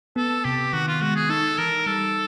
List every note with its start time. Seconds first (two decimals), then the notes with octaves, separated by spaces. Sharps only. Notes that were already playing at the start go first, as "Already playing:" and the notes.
0.16 B3 A4
0.45 C3 G4
0.73 D#3 F#4
0.88 F4
1.01 G#3 F#4
1.16 G#4
1.29 D#4 A4
1.58 E3 A#4
1.86 G3 A4